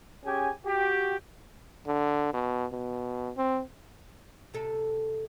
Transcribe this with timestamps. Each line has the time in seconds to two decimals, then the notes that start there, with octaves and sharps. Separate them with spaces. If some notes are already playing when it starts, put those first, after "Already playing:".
0.25 C#4 G4 G#4 G#5
0.65 F#4 G4
1.87 D3
2.34 B2
2.72 B2
3.37 C4
4.54 C3 A4